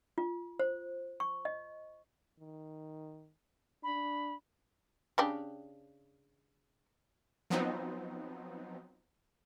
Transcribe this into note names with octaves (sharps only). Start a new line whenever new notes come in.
F4
C5
C#6
D#5
D#3
D4 B5
C#3 D4 G4
F3 F#3 B3 C4 D#4